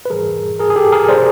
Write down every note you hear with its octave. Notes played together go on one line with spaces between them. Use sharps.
B4
G#2 E3 G3 G#4 A#4
G#4 A#4
G#4
G4 A4
G#4 A#4
C5 D5